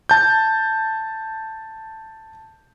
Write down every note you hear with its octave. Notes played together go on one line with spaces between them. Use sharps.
A5 G6